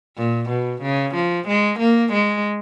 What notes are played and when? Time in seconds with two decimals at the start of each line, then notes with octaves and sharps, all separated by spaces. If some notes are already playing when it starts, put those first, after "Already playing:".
0.17 A#2
0.49 B2
0.82 C#3
1.15 F3
1.48 G#3
1.79 A#3
2.12 G#3